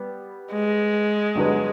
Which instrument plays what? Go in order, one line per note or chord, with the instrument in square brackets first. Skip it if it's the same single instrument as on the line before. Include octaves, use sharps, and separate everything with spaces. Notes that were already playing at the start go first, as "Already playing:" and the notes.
Already playing: [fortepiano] G3 B3
[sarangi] G#3
[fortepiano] G2 D3 F#3 B3